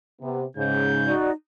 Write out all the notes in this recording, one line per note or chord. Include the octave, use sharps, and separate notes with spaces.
C3 B3
G#2 C#3 G6
D#4 F#4 D5